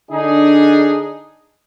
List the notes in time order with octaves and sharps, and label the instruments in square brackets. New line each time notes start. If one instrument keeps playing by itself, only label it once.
[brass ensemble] D3 D4 D#4 G#4